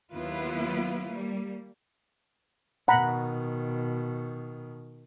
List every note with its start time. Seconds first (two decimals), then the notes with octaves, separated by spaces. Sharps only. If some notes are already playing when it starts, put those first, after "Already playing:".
0.13 D#2 F#3 B3 E4 F4 B4
1.08 G3 A#3
2.88 B2 D#3 F#5 A#5 B5